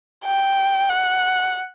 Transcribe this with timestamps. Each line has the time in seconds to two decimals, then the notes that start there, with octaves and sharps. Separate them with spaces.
0.25 G5
0.89 F#5